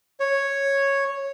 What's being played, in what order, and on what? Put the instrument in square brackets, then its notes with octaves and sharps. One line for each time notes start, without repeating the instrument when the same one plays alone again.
[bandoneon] C#5